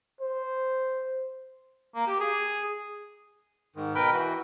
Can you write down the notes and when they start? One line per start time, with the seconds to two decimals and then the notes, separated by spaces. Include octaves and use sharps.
0.21 C5
1.95 A#3
2.06 G4
2.20 G#4
3.76 G#2 D#3
3.95 B2 A#4 B4 G5 B5 G6
4.13 E3 F#4